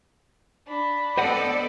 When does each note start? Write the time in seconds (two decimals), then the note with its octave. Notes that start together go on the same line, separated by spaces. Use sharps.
0.67 D4 B5
1.18 B3 A4 C5 D5 D#5 F#5